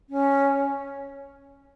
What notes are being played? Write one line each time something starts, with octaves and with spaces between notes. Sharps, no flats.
C#4